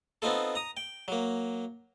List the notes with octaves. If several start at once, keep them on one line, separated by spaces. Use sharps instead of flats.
B3 C4 D#4 F4 A4
A#5 D#6
G5
F#3 A#3